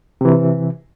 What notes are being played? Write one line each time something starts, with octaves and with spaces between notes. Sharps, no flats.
C3 E3